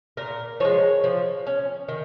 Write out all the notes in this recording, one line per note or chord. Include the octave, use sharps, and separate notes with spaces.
A#2 A#4
F3 G#3 C#5
F3
C#4
D#3